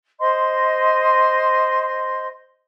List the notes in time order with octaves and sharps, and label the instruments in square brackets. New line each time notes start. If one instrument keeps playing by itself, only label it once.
[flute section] C5 D#5 C6